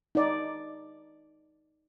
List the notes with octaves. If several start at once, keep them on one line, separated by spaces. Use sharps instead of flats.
D#4 D5